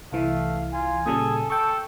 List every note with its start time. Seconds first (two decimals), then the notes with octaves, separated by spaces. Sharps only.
0.13 C2 E3 A3 F5
0.73 F4 G#5
1.06 A#2 C#3 G3 G#4 A4
1.50 A4 G5 A5 C#6